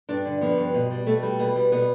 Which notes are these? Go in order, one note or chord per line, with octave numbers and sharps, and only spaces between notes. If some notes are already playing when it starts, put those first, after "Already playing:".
G2 D4
D3
F3 B3
G2
B2
G3
B2 A3
G3
B2 B3
G3
B2 B3